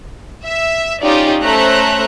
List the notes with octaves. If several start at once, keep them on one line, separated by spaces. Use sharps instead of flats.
E5
C#4 D#4 F4 G4 D5
A3 C#4 C5 E5 A#5 F#6